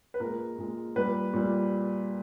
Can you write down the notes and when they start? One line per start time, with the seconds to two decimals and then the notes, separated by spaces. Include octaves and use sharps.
0.14 B4
0.20 A#2 G#3 A#4
0.58 A#2 G#3
0.96 A#2 G3 B4
1.33 A#2 G3